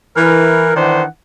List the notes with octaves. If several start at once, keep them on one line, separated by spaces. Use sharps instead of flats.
E3 A#4
D#3 E3 D4 C5 F#5